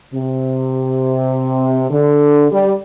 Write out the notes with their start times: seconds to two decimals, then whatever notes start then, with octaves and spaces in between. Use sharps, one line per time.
0.14 C3
1.91 D3
2.51 G3